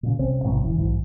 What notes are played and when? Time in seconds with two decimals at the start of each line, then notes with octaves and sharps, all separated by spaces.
0.03 A#2 C#3
0.19 C2 C3 C4 C#4
0.44 A1 G#2 C3 G#3
0.62 E1 C#3 E3
0.76 B1 G#2 E3